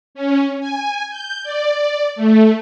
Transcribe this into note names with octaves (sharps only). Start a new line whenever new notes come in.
C#4
G#5
G6
D5
A3